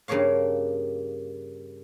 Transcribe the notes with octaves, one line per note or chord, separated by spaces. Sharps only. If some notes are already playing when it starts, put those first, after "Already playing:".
G2 C#3 A#3 C#5 F5